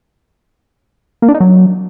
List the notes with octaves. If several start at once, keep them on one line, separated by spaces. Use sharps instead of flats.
A#3
D4
D#4
F#3